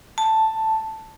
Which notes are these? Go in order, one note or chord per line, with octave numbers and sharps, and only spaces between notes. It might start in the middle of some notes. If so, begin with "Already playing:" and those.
A5